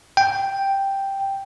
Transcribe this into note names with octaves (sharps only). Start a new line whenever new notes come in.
G5